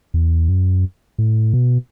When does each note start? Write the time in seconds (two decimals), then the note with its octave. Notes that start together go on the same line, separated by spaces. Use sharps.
0.14 E2
0.48 F#2
1.18 A2
1.54 B2